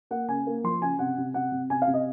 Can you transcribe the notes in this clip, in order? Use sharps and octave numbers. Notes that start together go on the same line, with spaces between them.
A#3 F#5
C#3 G#5
A#3
F3 C6
C#3 G#5
C3 F#5
C3
C3 F#5
C3
C3 G#5
F5
C3
D#5